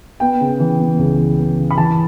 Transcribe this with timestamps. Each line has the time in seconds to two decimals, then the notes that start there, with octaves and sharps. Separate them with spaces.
0.20 B3 G5
0.41 C#3
0.60 E3
0.79 B3
0.99 C#2
1.18 E3
1.39 B3
1.58 C#3
1.71 B5
1.78 E3 A5